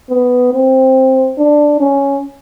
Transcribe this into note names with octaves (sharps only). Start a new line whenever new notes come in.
B3
C4
D4
C#4